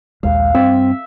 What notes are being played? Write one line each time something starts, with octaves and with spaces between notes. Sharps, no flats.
A#1 D#2 G#3 F5
G2 C4 E5